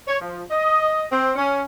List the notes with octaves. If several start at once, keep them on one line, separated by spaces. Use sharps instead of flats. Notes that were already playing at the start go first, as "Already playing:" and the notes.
C#5
F3
D#5
C4
C#4